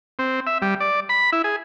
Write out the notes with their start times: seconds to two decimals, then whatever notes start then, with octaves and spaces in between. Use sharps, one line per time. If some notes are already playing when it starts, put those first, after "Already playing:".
0.19 C4
0.47 E5
0.62 G3
0.80 D5
1.09 B5
1.32 E4
1.44 G#4